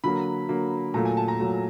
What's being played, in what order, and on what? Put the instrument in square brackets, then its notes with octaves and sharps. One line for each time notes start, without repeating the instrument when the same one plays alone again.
[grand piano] D3 F#3 A#3 B5
D3 F#3 A#3
A#2 F#3 A3 A#5
G#5
A5
A#5
A#2 F#3 A3